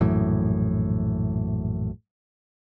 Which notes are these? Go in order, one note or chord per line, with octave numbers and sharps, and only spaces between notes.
A#1 F#2 A2 E3